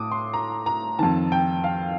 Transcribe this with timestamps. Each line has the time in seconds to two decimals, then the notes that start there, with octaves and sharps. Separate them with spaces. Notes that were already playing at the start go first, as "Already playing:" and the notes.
Already playing: A2 D6 D#6
0.11 C6
0.33 A#5
0.66 A#5
0.99 F2 D#3 A5
1.32 G5
1.64 F5